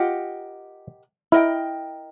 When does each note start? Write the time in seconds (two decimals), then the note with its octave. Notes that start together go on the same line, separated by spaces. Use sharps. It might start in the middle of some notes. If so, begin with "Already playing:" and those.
Already playing: F4 G4 A#4 D#5 F#5
1.32 E4 A#4 D#5 G5